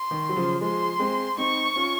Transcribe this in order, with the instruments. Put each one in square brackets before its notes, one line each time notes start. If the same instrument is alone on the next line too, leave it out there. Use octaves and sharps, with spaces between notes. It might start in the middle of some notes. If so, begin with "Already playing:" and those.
Already playing: [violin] C6
[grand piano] D#3
F#3
C#3 F3
[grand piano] F3 G#3 [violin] C6
[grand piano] G#3 C4
[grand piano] C4 D#4 [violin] C#6
[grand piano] C#4 F4